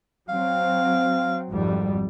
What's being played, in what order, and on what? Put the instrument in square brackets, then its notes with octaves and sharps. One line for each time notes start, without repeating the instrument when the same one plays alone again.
[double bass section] F#3 C4 [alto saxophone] F5
[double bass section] G#1 F2 G3